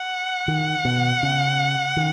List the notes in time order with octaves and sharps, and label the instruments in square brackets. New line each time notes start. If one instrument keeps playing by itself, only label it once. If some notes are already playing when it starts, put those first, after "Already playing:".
Already playing: [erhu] F#5
[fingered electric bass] D#3
B2
C#3
D#3